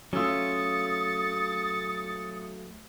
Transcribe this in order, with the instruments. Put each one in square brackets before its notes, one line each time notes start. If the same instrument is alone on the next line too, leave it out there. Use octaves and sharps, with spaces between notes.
[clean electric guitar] F#3 A3 F4 [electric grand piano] C#4 E6 [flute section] D#6 [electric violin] A6 C#7